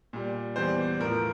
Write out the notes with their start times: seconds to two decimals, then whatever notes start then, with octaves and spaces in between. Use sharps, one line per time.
0.13 A#2 G3
0.56 E2 E3 G3 C5
1.00 A2 F3 A#4